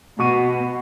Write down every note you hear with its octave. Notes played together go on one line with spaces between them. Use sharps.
B2 F#4 C#6 D#7